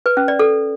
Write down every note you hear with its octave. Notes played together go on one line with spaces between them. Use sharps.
B4
C#4
D5
A4